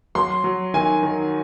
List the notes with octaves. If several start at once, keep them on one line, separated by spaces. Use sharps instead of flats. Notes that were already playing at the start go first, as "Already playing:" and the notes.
F#3 C6
F#3
D#3 G#5
D#3